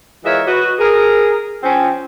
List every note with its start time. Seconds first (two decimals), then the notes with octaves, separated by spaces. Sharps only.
0.25 E3 G#3 F4 A#4 C#5 E5
0.47 F#4 B4 D#5
0.78 G#4 A#4
1.63 F3 C4 C#4